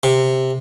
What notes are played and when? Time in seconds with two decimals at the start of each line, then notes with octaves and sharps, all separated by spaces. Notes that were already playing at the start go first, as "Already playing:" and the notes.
0.03 C3